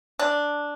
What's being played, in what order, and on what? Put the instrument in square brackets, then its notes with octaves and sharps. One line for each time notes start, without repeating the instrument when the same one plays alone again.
[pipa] D4